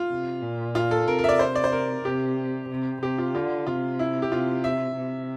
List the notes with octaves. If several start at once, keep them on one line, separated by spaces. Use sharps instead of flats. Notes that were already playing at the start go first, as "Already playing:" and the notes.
Already playing: F4
C3
A#2
F4
A4
C3 A#4
A#4
E5
D5
C5
D5
C5
A#4
C3 G4
C3
C3 G4
F4
D3 F4
C3 F4
E4
G4
C3 F4
E5
C3